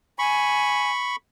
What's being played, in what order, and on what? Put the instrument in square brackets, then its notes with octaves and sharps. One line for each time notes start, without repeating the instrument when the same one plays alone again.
[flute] G#5 [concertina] B5 C#6